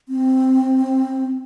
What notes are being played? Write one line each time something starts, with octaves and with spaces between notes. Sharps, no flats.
C4